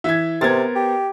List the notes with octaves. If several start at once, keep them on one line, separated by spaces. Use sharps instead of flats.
E3 E5 G#6
C3 B3 A#4 C5 G#6 A6
G4